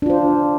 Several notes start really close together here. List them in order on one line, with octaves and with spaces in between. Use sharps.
D4 F4 C5